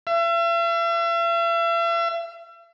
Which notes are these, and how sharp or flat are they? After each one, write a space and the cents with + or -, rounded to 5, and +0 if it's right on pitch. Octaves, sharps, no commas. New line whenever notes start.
E5 +40